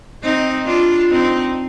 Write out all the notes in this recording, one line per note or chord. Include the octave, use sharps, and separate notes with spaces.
C4 D#4
D4 F4
C4 D#4